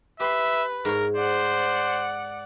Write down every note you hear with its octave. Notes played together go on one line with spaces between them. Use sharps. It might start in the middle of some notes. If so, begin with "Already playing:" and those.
G4 B4 E5 C6
G#2 A#4 C#5
C5 D5 F#5